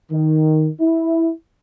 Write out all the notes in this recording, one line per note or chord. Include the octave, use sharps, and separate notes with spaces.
D#3
E4